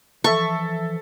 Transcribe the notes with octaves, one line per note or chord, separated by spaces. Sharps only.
E3 F3 A4 E5 C#6